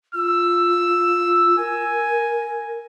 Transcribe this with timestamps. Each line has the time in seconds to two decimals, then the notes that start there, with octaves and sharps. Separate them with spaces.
0.15 F4 E6
1.58 A#4 G#5